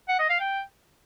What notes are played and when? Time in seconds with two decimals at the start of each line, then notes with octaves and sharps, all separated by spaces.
0.08 F#5
0.19 D#5
0.30 F5
0.40 G5